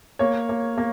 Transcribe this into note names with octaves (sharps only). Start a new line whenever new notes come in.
A#3 C#5
A#3
A#3